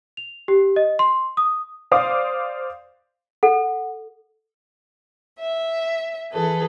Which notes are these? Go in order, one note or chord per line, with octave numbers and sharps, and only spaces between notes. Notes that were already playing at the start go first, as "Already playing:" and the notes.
F7
G4
D#5
C6
D#6
C5 D5 F5 D6 D#6
A4 F#5
E5
E3 G#4 A4 B4